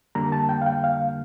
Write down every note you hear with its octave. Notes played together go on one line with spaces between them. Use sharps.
F2 D3 G3 A#3 A#5
A5
G5
F5
G5
F5